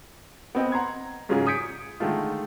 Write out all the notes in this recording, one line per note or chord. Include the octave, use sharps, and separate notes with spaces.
B3 C4 D#5 G5
F#5 A#5 C6 G#6
G#2 C#3 F#3 G#3 F4 G#4
D#6 G6 G#6 B6 C#7 D7
D3 D#3 G#3 A3 F4